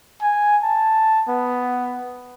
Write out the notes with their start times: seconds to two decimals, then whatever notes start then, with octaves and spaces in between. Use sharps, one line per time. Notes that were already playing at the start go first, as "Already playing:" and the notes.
0.22 G#5
0.63 A5
1.28 B3